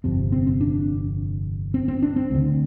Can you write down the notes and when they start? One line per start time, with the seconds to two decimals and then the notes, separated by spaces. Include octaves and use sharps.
0.04 G1 F2 C3 C4
0.32 C4
0.47 C4
0.61 D4
1.74 C4
1.88 C4
2.02 D4
2.16 C4
2.31 D2 D3